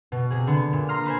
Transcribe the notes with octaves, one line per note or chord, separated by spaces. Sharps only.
B2
C3 G#4
D3 B3
A#2
A#5 C6 D#6 F6
B4 C5 G#5